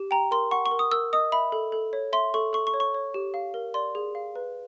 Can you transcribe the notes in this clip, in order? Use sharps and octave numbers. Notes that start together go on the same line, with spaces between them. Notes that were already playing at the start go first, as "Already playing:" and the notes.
Already playing: G4
G5 A#5
A#4 C6
F#5 C#6
C#6
A#4
D#6
A#4 E6
D#5 D#6
E5 B5
A4
A4
C#5
E5 C6
A4 C#6
A4 C#6
C#6
C#5
C#6
C#5
G4
F5
A#4
D5 C6
G#4
F5
B4